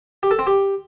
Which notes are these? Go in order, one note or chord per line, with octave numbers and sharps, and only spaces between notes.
G4
A4
C4
G4